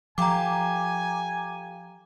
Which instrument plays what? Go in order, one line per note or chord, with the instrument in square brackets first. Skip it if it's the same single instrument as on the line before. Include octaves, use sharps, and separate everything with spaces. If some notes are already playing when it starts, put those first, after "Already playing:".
[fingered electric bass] F3 [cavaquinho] F4 G4 A4 [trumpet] G#5 [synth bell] A#5 D6